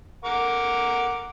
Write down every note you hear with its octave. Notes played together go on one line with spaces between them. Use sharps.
A#4 F#5 D6